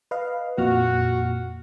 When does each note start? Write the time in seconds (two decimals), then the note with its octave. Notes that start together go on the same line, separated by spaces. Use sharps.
0.11 B4 D#5 F5
0.58 F2 A#2 F#4 F6